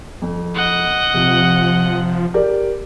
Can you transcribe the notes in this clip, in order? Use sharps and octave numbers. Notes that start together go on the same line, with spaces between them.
F2
D#5 F#5
C3 F3
G4 A#4 D5